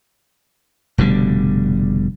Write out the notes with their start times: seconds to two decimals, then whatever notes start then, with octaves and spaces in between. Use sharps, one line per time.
0.98 F1 B2 D3 G3